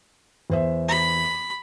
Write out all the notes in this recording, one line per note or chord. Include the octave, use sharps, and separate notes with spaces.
E2 C5 E5
B5